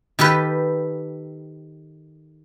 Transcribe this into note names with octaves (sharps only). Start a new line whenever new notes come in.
D#3 G4 A4 B4